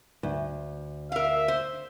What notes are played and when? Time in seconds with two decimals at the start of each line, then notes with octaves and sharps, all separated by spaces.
0.23 D2
1.12 A#4 E5 F5
1.48 C5